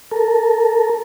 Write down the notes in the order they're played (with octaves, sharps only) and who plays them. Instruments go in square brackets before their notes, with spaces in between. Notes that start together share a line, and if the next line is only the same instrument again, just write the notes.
[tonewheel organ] A4 A#4